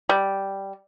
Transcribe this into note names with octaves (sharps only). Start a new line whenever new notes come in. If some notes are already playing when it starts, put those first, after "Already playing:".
G3